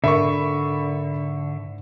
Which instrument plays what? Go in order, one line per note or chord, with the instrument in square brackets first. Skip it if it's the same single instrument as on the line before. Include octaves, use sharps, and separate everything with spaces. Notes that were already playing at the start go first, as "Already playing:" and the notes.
[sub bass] G#2 [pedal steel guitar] D3 [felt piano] A#4 B5 [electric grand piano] E5 C#6